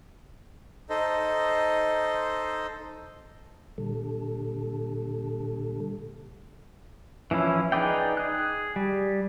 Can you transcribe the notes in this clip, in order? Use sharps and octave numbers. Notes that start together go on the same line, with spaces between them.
D#4 A4 C5 D#5
A#2 D3 G3 A4
E3 F3 C#4 E4
D#4 G#4 B4 D5 G5
G#4 F#6
G3